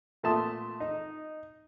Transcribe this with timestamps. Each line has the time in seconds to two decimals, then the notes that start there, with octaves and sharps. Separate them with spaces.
0.23 A#2 A3 E5 A5 C6 D#6
0.80 D#4